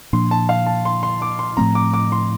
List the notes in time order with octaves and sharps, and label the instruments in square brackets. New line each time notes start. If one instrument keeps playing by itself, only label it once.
[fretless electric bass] A#2 F3 A#3 D4 [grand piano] C6
[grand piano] A5
F5
A5
C6
C6
D6
C6
[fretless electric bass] A2 F3 A3 C4 [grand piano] A#5
[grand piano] D6
D6
C6